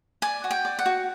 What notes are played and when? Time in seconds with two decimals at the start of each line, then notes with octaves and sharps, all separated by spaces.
0.22 D5 G#5
0.44 F#4
0.51 G5
0.65 D5
0.79 F#5
0.86 F#4